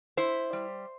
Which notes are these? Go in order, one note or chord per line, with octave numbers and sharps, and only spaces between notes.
E4 C5
G3